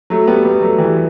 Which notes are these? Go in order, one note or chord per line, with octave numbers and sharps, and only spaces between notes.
F#3 A3
G3 B3
G3 B3
F#3 A3
E3 G3